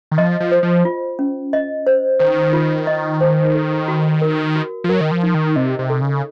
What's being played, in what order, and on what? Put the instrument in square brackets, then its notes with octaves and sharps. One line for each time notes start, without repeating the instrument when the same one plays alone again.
[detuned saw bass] D#3
[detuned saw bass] F3 [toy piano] D#5
[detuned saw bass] F3
[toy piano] C5
[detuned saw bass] F3
[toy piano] F4
C#4
D#5
C5
[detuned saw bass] D#3 [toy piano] C5
[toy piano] F4
D#5
C5
A4
F#4
A#4
F#4
[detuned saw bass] F3
[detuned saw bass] F#3 [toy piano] A#4
[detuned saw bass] D#3
F3
[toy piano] D#4
[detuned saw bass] D#3
[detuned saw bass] C3 [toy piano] D#5
[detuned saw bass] C3
[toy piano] A4
[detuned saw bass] C#3